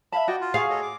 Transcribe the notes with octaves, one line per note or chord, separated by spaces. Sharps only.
E5 F5 A5 B5
F#4 D5 D#5 G5
F4
G#4 F5 C#6
A4 C#5 D#5
D6